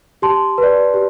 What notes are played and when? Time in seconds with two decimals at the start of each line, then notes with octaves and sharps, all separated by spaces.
0.22 G4 A5 C6
0.58 B4
0.63 D5
0.94 G4